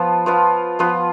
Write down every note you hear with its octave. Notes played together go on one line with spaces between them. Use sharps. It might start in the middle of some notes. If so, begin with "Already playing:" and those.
Already playing: F3 B3 F4 A5
F3 B3 F4
F3 B3 F4